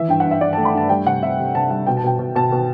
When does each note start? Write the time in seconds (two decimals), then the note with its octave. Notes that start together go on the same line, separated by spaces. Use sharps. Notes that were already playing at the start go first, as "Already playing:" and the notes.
Already playing: E3 E5
0.08 G2 G5
0.20 G2 F#5
0.31 E5
0.41 G2 D5
0.53 A3 A5
0.65 B5
0.73 G2 A5
0.89 G3 G5
1.06 C3 F#5
1.23 C3 E5
1.39 C3
1.55 C3 A5
1.70 G3 F#5
1.87 B2 G5
1.97 A5
2.04 B2 G5
2.19 B2
2.35 B2 A5
2.52 B2